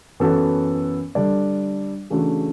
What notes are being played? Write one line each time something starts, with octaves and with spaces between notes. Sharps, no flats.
F#2 E3 B3 F#4 A4
D3 G3 D4 A4 D5
C#3 E3 A3 D4 F#4